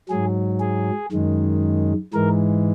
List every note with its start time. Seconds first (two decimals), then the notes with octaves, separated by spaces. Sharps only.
0.09 G#2 F#3 G#4
0.60 G#4
1.12 F#2 D#3 G#3
2.14 G#2 E3 G#3 A#4